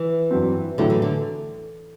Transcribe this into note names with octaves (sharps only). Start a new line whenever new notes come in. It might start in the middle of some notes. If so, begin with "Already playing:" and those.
Already playing: E3
G2 F#3 C4
A2 D3 F#3 A3 E4
E3
D3